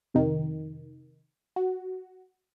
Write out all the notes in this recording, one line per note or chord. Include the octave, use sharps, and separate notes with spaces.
F2 C3 D#3
F#4